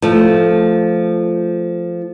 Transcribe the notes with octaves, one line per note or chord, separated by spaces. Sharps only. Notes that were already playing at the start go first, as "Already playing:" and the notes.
F3 A3